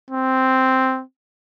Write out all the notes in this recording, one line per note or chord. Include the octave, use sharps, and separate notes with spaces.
C4